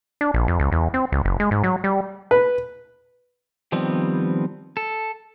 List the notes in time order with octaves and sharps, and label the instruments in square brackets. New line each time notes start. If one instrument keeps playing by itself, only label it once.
[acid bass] D4
A#1
F2
C#2
E2
C4
C#2
F#1
G#3
G#2
F#3
G3
[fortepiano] B4
[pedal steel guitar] D#3 F3 G3 B3 C4
A4